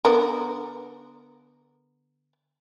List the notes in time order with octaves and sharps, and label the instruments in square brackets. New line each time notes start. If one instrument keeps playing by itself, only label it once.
[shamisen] D3 B3 A#4